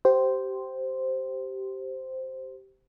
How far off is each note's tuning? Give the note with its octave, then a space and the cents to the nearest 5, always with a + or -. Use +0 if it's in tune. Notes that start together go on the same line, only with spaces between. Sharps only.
G4 -20 C5 -5